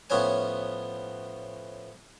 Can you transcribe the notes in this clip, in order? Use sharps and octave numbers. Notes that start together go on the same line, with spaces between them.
A2 F3 B3 C#4 C#5 G#5